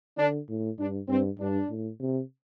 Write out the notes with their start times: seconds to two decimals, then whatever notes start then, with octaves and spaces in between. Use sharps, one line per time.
0.18 D3 D4
0.49 A2
0.79 G2 D4
1.08 G2 C4
1.40 G2 D4
1.69 A2
2.00 C3